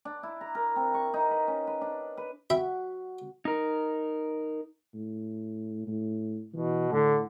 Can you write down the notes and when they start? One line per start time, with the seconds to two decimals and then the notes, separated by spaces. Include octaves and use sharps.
0.05 D4
0.23 E4
0.41 A#5
0.55 A#4
0.76 C4
0.94 C#6
1.14 D#4
1.31 B4
1.48 C#4
1.67 B4
1.81 D4
2.17 B4
2.50 F#4 E5 G5 B5
3.45 D#4 A#4
4.94 A2
5.87 A2
6.54 B2 E3
6.92 A2 D3